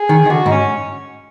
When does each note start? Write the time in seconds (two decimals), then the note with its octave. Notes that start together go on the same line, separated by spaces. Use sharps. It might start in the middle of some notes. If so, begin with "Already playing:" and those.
Already playing: G#4
0.09 D#3
0.26 D#3
0.30 D3 F#4
0.46 G#2
0.52 C#4